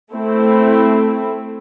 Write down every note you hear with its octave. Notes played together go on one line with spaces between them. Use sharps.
A3 C4 E4